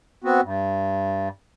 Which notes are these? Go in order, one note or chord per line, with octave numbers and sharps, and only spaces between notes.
B3 C4 F#4
G2